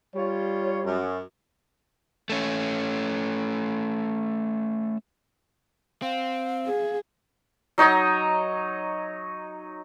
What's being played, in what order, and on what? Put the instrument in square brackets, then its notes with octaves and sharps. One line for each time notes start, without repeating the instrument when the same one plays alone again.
[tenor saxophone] G3 [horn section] F4 C#5
[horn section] F#2
[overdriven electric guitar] A3 C#4
[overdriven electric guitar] C4 [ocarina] F5
[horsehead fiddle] G#4
[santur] F#3 D#4 C#5 D#5